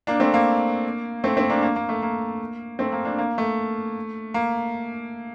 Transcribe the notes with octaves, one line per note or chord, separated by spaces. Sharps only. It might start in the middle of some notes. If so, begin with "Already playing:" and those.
A#3 D4
A3 C4
A#3
A3 C4
A3 C4
A#3 D4
A#3
A#3
A3
A#3
A3 C4
A#3
A#3 D4
A#3
A3
A#3